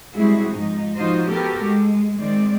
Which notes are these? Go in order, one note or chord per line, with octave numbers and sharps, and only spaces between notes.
G3 G#3 C4 E4 F#4 G#4
G#2 F3 D#4
F3 D#4 F4 F#4 C5 D#5
B3 F#4 G4 A4 A#4
G#3
D#3 G#3 C4 D5